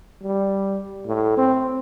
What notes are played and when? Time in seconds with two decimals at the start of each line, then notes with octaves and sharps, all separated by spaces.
0.23 G3
1.06 A2
1.37 C4